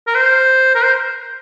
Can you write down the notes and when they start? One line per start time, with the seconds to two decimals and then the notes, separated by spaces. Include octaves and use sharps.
0.07 A#4
0.15 C5
0.75 A#4
0.83 C5